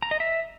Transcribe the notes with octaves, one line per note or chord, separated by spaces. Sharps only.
A#5
D#5
E5